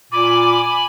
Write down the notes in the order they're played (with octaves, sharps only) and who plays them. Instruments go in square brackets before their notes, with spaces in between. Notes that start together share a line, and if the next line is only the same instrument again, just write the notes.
[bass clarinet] A#2 [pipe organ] G#5 B5 [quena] D6